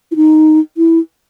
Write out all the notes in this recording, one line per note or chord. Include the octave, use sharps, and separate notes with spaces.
E4
D#4
E4